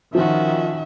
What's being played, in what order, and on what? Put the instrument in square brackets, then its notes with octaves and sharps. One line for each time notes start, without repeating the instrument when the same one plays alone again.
[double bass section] D#3 [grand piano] F3 F4 [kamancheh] C#4 F#4 [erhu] E5